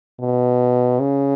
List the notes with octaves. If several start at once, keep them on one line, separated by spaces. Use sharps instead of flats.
B2
C#3